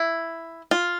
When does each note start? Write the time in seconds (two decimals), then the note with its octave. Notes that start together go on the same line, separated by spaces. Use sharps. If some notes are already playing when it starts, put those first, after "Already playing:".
Already playing: E4
0.71 F4